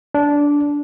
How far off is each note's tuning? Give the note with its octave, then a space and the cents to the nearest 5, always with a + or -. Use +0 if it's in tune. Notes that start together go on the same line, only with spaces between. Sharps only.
D4 -15